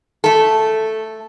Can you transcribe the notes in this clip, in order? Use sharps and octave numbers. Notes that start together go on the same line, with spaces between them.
A3 A4